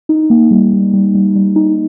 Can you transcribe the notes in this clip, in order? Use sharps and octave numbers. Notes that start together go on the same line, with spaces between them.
D#4
A#3
G3
G3
G3
G3
G3
D#4